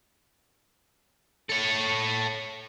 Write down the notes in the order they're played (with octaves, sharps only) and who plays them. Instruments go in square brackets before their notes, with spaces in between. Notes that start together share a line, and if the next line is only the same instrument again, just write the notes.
[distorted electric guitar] A4 C#5